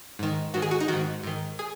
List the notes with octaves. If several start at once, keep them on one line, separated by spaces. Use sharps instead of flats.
G#2 D#3
G#2 D#3 F#4
G#4
F#4
D#4
G#2 D#3 F#4
G#2 D#3
G#4